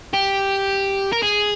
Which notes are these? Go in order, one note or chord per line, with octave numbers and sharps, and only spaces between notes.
G4
A#4
G#4